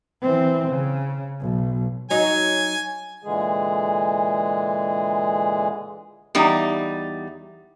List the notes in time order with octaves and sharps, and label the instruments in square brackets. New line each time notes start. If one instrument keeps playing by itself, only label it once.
[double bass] E3 C4
C#3
B1
[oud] F#3 D#4 [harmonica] G#5
[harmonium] A#2 D3 E3 G#3 G#4
[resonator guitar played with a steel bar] E2 G3 D#4